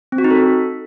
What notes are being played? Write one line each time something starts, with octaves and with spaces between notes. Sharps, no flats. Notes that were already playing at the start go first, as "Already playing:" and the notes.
C4
F#4
D#4
A4